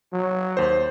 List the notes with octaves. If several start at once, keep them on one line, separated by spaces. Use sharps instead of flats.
F#3
D#2 C5